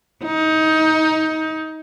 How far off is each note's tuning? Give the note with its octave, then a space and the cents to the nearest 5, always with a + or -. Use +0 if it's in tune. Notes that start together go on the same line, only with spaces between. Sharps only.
D#4 +20